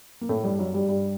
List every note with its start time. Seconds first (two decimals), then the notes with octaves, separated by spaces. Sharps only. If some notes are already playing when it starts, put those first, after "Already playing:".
0.21 A#3
0.29 A2 A3
0.44 G2 G3
0.59 F#2 F#3
0.74 G2 G3
0.89 G2 G3